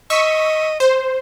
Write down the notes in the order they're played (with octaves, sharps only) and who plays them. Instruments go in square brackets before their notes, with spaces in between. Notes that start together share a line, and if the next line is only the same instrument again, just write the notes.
[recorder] D#5 [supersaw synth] C#6 E6 B6
[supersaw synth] C5